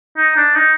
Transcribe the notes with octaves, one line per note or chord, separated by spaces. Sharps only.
D#4
D4
D#4